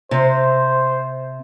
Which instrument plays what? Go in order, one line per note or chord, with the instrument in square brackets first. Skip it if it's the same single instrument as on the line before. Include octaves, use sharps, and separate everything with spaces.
[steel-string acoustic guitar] C3 [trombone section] C5